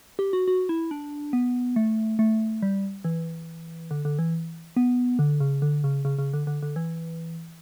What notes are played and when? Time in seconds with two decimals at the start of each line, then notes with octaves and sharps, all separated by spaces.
0.19 G4
0.33 F#4
0.48 F#4
0.69 E4
0.91 D4
1.33 B3
1.76 A3
2.19 A3
2.62 G3
3.04 E3
3.91 D3
4.05 D3
4.19 E3
4.77 B3
5.19 D3
5.40 C#3
5.62 D3
5.84 C#3
6.05 C#3
6.18 C#3
6.33 D3
6.47 D3
6.62 D3
6.76 E3